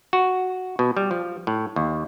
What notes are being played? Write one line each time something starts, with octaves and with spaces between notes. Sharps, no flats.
F#4
B2
G3
F3
A2
D#2